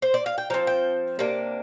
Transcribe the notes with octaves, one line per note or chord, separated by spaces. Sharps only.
C5
D5
F5
G5
F3 C4 A#5
G5
C3 A#3 D4